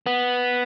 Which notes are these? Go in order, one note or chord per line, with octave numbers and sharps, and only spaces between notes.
B3